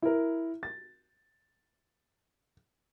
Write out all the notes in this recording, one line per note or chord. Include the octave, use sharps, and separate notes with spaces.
E4 A#4
A6